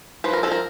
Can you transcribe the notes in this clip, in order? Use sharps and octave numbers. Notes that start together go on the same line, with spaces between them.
F3 B4
A#4
F3 A4
A#4